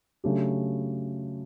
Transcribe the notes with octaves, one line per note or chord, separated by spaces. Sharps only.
C#3 F#3 A3 D4 G4